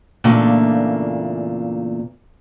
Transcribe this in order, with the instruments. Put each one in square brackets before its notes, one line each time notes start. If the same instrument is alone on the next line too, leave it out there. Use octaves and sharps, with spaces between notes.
[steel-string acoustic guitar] E2 A#2 C#3 A3 A#3 D4